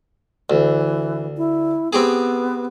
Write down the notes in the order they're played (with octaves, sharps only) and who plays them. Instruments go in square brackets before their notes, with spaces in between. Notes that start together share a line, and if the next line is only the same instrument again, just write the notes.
[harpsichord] D2 [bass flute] E3
[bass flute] E4
[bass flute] B3 [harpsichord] C4 G4 G#4